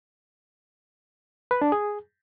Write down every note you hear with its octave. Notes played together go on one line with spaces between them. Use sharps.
B4
D4
G#4